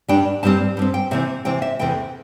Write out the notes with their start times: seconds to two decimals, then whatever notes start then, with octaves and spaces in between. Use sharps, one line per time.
0.08 G2 G3 D4 G5
0.43 G2 G3 C4 A5
0.77 G2 G3 C4
0.94 G5
1.11 C3 E3 C4 E5
1.45 C3 E3 C4 G5
1.62 E5
1.79 E2 C3 E3 A3 G5